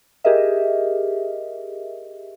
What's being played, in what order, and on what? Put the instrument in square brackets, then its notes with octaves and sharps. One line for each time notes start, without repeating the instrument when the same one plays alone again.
[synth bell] G4 G#4 A#4 D#5 E5